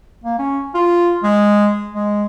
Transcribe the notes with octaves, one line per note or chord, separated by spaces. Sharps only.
A#3
C#4
F4
G#3
G#3